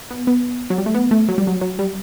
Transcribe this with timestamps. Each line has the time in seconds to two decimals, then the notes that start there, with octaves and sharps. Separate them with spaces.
0.11 B3
0.27 B3
0.70 F#3
0.78 G3
0.86 A3
0.95 B3
1.11 A3
1.29 F#3
1.38 G3
1.47 F#3
1.61 F#3
1.79 G3